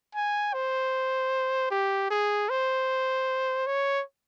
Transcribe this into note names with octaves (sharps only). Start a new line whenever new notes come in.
G#5
C5
G4
G#4
C5
C#5